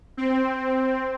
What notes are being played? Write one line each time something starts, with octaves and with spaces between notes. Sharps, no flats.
C4